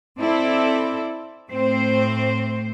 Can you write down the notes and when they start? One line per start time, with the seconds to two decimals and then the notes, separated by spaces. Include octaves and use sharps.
0.19 C4 E4 A4 D5
1.50 A2 C4 C5